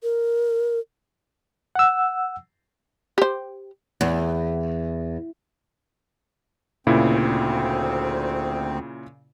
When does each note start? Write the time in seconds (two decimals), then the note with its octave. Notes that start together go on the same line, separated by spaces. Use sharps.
0.03 A#4
1.75 F#5 E6
3.18 G4 C5
4.01 E2
6.87 D2 A#2 C#3 C4 E4